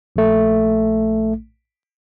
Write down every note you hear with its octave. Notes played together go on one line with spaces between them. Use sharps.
A#1 A3